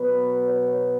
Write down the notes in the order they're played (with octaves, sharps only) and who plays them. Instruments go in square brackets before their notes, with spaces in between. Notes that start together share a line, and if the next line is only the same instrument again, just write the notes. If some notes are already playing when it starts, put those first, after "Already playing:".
Already playing: [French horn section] B2 F#3 B3 B4
C#5